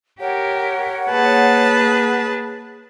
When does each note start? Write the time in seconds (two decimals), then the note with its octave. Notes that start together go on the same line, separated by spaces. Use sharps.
0.20 G4 A#4 C#5 F#5
1.10 A#3 G#4 B4 A5